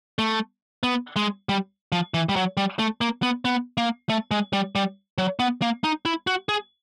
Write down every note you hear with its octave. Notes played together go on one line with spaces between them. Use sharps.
A3
B3
G#3
G3
F3
E3
G3
F#3
G3
A3
A#3
B3
B3
A#3
A3
G#3
G3
G3
F#3
B3
A#3
D#4
E4
F#4
G#4